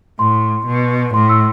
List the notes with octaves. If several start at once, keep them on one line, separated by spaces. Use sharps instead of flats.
A2 C6
B2
A2 C6
E6